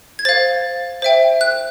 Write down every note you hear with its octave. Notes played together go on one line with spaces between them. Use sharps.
G#6
C5 F5 A6
C5 E5 G5
F#6